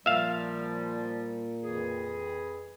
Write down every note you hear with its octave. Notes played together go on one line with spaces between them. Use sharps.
A#2 F3 G3 E5 F5
F2 E3 G#4